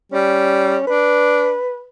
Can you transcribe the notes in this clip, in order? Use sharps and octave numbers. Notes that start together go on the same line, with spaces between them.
G3 C#4
D4 B4